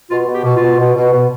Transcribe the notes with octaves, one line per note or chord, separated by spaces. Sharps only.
B2 F4
B2
G4
B2
F4
B2
B2
B2
B2